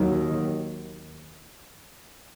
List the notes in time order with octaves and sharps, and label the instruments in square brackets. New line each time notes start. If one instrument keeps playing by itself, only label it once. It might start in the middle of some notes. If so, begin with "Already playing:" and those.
Already playing: [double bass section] D#2 D#3 F#3